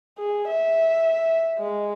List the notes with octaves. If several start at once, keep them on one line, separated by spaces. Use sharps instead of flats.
G#4
E5
G#3